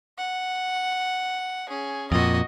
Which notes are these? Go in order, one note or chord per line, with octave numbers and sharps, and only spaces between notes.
F#5
C#4 G#4
F2 A#2 F#4 D#5